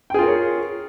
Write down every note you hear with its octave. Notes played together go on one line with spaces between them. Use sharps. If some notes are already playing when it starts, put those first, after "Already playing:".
F4 G#4 A#4 C#5 G5